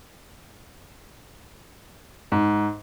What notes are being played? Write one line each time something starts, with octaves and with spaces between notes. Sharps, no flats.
G#2